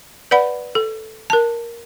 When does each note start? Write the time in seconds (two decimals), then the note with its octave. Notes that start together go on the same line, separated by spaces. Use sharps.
0.31 B4 D5 F#5 B5
0.75 A4
1.30 A#4 A5